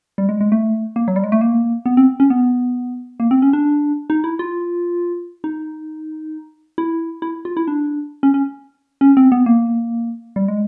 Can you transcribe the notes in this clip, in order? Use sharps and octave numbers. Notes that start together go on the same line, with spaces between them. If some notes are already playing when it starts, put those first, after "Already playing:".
G3
G#3
G#3
A3
A#3
F#3
G3
G#3
A3
A#3
B3
C4
C#4
B3
A#3
C4
C#4
D4
D#4
E4
F4
D#4
E4
E4
F4
E4
D4
C#4
C#4
C#4
C4
B3
A#3
G3
G#3